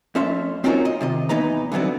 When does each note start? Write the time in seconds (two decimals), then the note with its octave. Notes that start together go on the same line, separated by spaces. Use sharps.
0.15 F2 A3 C#4 E5 C6
0.64 C4 C#4 D#4 F4 F#4 A#4
0.85 D#5
1.01 C3 D#3 D#5
1.29 E2 E3 B3 D#4 B4 A#5
1.72 D3 E3 F#3 B3 C4